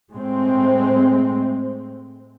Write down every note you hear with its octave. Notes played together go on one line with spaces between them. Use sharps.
A2 G#3 C4